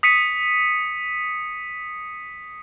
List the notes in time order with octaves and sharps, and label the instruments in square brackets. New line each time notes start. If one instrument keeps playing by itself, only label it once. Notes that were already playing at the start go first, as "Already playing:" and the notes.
[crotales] D#6 B6 C#7 D#7